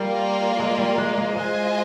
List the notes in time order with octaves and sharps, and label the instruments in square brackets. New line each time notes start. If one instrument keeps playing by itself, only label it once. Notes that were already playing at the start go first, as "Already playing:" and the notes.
Already playing: [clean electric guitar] G3 [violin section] A#3 F4 A#4 D5
[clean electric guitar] G#3
G3
G#3
G#3
[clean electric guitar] G#3 [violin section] F4 C5 D#5 G#5